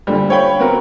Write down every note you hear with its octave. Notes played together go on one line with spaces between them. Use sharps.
A#2 D3 G3
C#5 F5 G5 B5
B3 C4 F#4 A#4